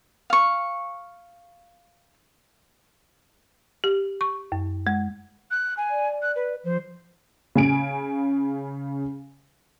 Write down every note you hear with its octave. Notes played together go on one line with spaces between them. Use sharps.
F5 C#6
G4
C#6
F#2
G#3
F#6
G#5
D5
F#6
B4
F3 C5
C#3 G#5 D7